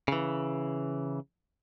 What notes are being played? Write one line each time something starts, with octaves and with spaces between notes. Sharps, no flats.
C#3 E3